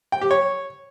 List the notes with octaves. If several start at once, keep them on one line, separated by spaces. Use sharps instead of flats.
G5
G4
C#5